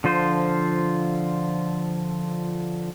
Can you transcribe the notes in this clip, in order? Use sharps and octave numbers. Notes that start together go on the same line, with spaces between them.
D3 F3 F4 C5